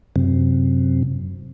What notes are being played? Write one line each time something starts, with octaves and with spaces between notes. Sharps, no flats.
F#2 C3